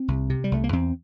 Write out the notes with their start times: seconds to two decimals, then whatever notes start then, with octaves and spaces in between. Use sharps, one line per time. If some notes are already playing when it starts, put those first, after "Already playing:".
Already playing: C4
0.08 C2
0.30 C3
0.44 G3
0.52 C2 A3
0.64 A#3
0.73 E2 C4